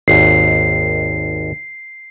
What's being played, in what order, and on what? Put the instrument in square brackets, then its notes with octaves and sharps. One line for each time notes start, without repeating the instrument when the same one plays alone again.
[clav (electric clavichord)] G#1 D#2 [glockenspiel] C7